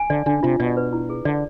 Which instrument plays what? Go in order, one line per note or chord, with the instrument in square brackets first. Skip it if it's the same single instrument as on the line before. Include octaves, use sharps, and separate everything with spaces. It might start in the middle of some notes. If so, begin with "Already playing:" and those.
Already playing: [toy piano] G#5
[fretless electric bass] D3 [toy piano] D5
[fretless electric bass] D3 [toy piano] D4
[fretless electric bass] C3 [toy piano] F4
[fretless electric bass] B2 [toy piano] D5
[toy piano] B4
E4
G#4
[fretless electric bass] D3 [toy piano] D5